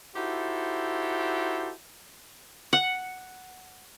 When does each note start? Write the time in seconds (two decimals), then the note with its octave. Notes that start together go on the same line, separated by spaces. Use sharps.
0.16 D#4 E4 F#4 G4 A4 C5
2.73 F#5